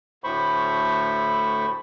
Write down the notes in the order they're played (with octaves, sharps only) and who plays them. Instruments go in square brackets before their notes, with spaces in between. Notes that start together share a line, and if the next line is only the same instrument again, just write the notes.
[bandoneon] D2 A2 A3 C5 B5 C#6